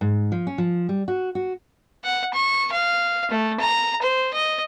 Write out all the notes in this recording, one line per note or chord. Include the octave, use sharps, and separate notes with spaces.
G#2
F3
C#4
F3
G3
F#4
F#4
F#5
C#6
F5
A3
A#5
C5
D#5